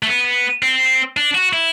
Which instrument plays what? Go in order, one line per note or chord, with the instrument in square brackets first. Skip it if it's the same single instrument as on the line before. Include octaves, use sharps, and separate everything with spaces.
[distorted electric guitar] A3
B3
C4
D4
F#4
E4